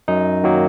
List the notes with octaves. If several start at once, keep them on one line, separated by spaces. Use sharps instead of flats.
F#2 D#4
D#3 F#3 A#3